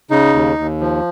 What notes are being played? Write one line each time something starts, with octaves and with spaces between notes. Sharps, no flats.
C#3 D#4
D#2
D#2
F3